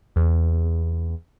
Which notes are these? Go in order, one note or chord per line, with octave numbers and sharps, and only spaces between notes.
E2